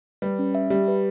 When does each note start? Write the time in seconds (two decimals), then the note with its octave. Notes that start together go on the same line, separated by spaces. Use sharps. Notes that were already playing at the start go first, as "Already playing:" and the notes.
0.22 G3 B4
0.39 C#4
0.55 E5
0.70 G3 G4
0.88 B4